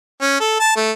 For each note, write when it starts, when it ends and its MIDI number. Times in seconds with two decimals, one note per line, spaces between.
0.21 0.36 61
0.40 0.57 69
0.60 0.75 81
0.76 0.92 57